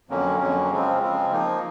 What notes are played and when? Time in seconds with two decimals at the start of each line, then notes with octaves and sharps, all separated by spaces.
0.09 F2 D3 F#3 A#3 C#4
0.40 F2 D3 F#3 A#3 C#4
0.70 C#3 F3 G#3 C4
1.02 C#3 F3 G#3 C4
1.32 F3 A#3 D#4